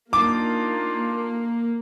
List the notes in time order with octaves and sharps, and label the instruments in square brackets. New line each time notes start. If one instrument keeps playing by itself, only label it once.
[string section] A#3 [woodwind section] D4 D#4 F4 [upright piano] D6